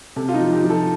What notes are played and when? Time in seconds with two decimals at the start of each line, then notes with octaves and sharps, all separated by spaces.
0.16 C3 A4
0.28 F4
0.34 D#4
0.40 F3
0.53 G4
0.64 F3
0.70 A4